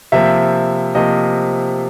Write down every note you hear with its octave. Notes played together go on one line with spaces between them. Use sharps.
C3 F3 A#3 E5
C3 F3 A#3 D#5